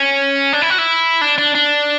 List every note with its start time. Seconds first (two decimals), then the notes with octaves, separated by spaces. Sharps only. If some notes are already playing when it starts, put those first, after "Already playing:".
Already playing: C#4
0.53 D4
0.62 E4
0.70 F#4
0.78 E4
1.21 D4
1.38 D4
1.55 D4